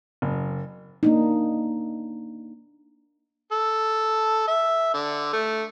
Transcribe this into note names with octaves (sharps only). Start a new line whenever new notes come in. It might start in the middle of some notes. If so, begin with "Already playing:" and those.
F#1
A#3 D4 D#4
A4
E5
D3
A3